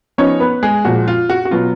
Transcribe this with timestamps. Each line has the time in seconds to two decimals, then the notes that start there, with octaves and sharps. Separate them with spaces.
0.18 F3 B3 C#4 D#4 C#5
0.40 B3 B4
0.63 G#3 G#4
0.85 A#2 F3 G#3 F#4
1.08 F4
1.30 F#4
1.45 F#4
1.51 B2 F#3 B3 F4